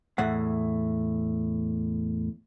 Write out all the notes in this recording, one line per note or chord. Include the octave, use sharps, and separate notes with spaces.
E2 A2 F#5